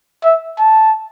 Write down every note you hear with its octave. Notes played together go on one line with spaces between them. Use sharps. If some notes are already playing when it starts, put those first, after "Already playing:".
E5
A5